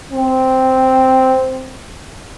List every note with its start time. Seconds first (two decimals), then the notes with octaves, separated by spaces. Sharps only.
0.12 C4